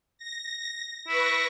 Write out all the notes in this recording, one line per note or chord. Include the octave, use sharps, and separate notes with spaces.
A#6
E4 B4 C#6 A#6